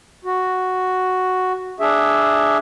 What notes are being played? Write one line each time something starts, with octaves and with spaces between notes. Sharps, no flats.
F#4
D4 G#4 E5